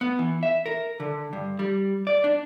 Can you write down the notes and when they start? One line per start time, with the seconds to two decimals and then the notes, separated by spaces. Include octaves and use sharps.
0.01 B3
0.19 E3
0.43 E5
0.66 A#4
1.00 D3
1.33 G2
1.59 G3
2.07 D5
2.24 D4